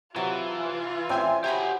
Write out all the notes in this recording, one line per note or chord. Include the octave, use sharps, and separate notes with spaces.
C3 E3 F#3 F4 A5
A1 C4 D4 E4 G#5
F#3 G4 C5 F#5 G#5 A#5 B5